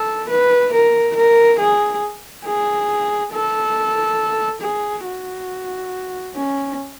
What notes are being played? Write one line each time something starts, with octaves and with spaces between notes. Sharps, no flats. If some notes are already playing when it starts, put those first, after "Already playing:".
Already playing: A4
B4
A#4
A#4
G#4
G#4
A4
G#4
F#4
C#4